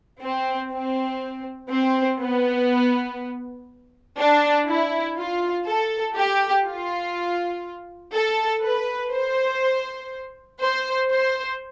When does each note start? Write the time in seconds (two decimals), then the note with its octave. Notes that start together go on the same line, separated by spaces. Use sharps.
0.22 C4
0.72 C4
1.71 C4
2.20 B3
4.19 D4
4.67 E4
5.17 F4
5.66 A4
6.16 G4
6.66 F4
8.14 A4
8.64 B4
9.12 C5
10.61 C5
11.11 C5